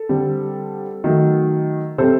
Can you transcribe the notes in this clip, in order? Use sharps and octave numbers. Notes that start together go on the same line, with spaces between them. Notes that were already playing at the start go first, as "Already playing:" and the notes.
Already playing: A4
D3 G3 C4
D#3 F#3 A3
C3 G3 C4 A4 C5